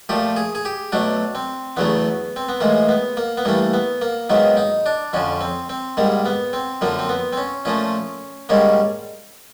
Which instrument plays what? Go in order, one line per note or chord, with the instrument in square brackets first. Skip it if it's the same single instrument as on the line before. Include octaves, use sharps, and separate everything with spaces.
[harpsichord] A#2 F3 A3 G4
G#4
G#4
G4
B2 F#3 A3 D4
C4
E2 C#3 F#3 A3 B3
C4
B3
A2 E3 G#3 A#3
B3
A#3
B3
G2 E3 A3 A#3
B3
A#3
G#2 D#3 F#3 A#3 B3
D#4
D4
F2 D3 F3 C#4
C4
C4
G#2 D#3 G3 A#3
B3
C4
F#2 D3 F3 A#3
C4
B3
C4
C#4
A#2 F3 A3 C#4
G#2 D#3 G3 A#3 C#4